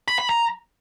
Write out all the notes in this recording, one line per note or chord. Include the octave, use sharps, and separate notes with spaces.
B5
B5
A#5